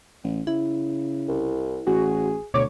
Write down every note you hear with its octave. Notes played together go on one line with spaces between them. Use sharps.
A1
C#3 E4
C2
A1 F#4 G#4
D2 B2 C#5 D6